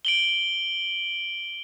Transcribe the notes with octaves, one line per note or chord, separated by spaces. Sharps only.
D7 F#7 G7